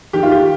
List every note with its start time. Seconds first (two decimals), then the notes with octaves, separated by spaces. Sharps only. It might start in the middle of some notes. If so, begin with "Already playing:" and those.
0.13 D#3 G4
0.23 F4
0.31 G4